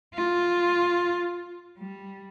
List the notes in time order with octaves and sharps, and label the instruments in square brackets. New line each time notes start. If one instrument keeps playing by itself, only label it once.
[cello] F4
G3